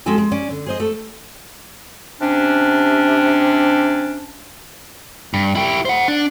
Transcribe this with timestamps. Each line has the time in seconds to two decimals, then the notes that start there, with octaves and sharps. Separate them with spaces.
0.06 G#3 C#4 F#4 G4 A4 G#5
0.18 G#3
0.31 C#4 D5
0.50 D3
0.66 G#4 C5 D#5
0.80 A3 A4
2.21 C3 C#4 D4
5.34 G2
5.55 E4 G4
5.85 C5 F#5
6.08 D4